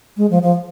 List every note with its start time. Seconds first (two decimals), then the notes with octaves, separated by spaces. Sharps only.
0.17 G#3
0.30 F3
0.43 F3